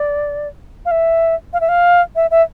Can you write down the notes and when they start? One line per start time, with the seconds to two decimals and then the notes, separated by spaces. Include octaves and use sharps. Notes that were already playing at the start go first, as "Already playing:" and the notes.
Already playing: D5
0.86 F5
0.91 E5
1.53 F5
1.61 E5
1.69 F5
2.16 E5
2.31 E5